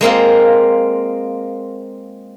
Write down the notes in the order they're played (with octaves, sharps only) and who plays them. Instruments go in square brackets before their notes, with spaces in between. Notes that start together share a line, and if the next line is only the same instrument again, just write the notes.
[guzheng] G#3 A#3 C4 F4